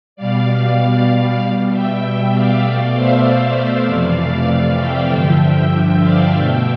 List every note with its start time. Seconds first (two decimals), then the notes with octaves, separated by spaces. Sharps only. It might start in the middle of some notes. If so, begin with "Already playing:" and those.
0.16 B2 G3 D5 F5
1.40 B2 G3
1.70 E5 G5
2.31 D5 F5
2.62 B2 A3
2.93 C5 E5
3.24 C5 E5
3.55 D5 F5
3.86 F2 C3 E3 A3
4.16 D5 F5
4.78 E5 G5
5.10 G2 D3 F3
6.01 D5 F5
6.32 B2 A3 E5 G5